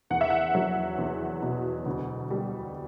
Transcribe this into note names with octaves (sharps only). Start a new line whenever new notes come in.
E2 F#5
E5
F#5
F#3
E2
B2
D2
G3